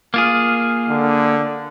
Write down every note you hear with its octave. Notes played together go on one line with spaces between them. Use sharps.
A#3 F4 G#4
D3